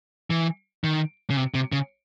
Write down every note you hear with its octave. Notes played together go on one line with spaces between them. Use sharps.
E3
D#3
C#3
C3
C3
C#3